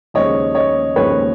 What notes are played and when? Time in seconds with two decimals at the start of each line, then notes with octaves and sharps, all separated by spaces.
0.14 D#2 C#3 F3 G#3 C#5 D#5
0.55 C#5 D#5
0.96 D#2 C#3 F3 G#3 B4 C#5